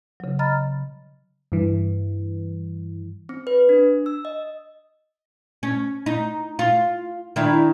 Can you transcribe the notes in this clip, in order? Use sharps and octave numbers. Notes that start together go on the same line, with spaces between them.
C#3 F#3
D#5 A#5 B5 F6 A6
G2 E3
C4
B4
D4
E6
D#5
C#4
D#4
F4
D#3 D4 E4